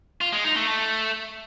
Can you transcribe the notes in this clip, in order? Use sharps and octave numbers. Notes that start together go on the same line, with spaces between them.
F4
G#3
D#4
A3
A3